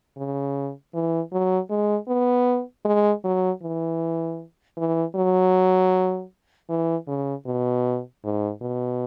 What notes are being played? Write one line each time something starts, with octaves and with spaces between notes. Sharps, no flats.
C#3
E3
F#3
G#3
B3
G#3
F#3
E3
E3
F#3
E3
C#3
B2
G#2
B2